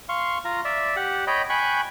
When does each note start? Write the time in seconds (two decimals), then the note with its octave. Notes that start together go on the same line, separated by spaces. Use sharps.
0.09 F5 C6 C#6
0.45 F4 A#5
0.65 D5 E5
0.96 G4 F#5
1.27 C#5 D#5 G5 B5
1.50 G5 G#5 B5 C#6 F#6